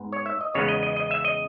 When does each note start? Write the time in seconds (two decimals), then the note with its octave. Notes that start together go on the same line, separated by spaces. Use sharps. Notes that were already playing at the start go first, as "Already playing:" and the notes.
Already playing: G#2 B3
0.12 C#5
0.26 E5
0.41 D#5
0.54 E2 C#3 G#3 B3 C#5
0.68 D#5
0.83 D#5
0.96 D#5
1.11 E5
1.25 D#5